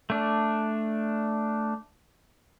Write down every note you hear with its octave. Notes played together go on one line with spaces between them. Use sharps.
A3 D4